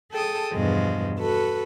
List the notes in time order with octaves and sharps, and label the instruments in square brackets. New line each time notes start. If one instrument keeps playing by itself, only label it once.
[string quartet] G#4 A4 G5 A5 D#6
E2 G2 B2 F3 G#3
F#4 A4 B4